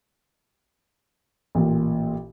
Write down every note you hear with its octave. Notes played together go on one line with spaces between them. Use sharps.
A1 A#2